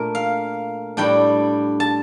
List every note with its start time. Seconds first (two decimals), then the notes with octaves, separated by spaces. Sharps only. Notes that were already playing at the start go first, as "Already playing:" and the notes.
Already playing: A#2 A3 D4 A#4
0.15 F5
0.97 A2 G3 D4 G5
1.80 A5